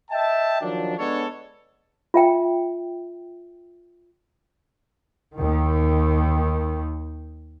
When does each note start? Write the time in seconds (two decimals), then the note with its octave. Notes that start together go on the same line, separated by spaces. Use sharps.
0.11 D#5 E5 G5 A5
0.62 D#3 F3 F#3 D4
0.98 G#3 B3 D4 A4 C#5
2.14 F4 E5 G5
5.35 D#2 D#3